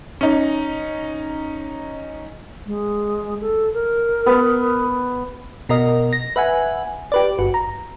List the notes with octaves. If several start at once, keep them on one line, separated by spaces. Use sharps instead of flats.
C#4 D#4
G#3
A4
A#4
B3
B2 A#4 D#5
A#6
B4 E5 F#5 G#5
G4 B4 D5
G1 F#4 B4
A#5